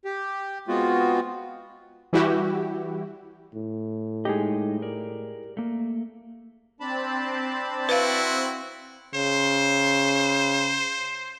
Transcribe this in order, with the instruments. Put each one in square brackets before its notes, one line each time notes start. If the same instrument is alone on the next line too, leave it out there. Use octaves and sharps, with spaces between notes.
[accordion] G4
G#3 B3 C4 F4 F#4
[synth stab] E3 G3 E4 F#4 G4
[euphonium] A2
[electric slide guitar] G#3 D#4 D#5 [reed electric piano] G4 G#4
[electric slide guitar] A#4 D5
A3 A#3
[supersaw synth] C4 [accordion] D4 A5 B5
[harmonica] E4 F#4 [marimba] B4 F5
[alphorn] C#3 [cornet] C5